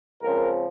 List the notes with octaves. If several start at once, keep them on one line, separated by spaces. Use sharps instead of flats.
C#2 C#3 F3 C4 A#4